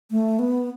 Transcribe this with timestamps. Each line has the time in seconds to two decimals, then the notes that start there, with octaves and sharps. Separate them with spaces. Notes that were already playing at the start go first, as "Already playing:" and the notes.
0.11 A3
0.39 B3